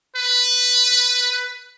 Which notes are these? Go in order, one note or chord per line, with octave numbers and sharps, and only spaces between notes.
B4